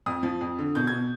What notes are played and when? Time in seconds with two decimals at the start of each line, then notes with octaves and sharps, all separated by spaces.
0.06 F2 D#6
0.23 F3
0.41 F2
0.59 D3
0.75 B2 G6
0.87 B2 G#6